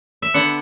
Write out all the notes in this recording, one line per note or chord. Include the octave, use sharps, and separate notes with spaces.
E5
D3 B3 D4 F#5